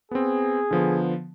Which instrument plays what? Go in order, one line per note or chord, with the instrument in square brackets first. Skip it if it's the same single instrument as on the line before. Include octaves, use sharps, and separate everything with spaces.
[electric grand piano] B3 C4 [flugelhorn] G#4
[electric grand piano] D3 F3 B3